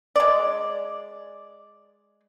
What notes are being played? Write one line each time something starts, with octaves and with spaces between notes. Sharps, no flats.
G#3 D5